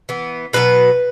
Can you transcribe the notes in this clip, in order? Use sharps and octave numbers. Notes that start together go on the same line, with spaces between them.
E3 B3
B2 F#3 B3 B4